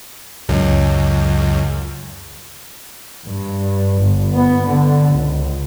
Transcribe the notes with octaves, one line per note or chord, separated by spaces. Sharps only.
C#2 F#2
G2
G1
B3
D3
C#2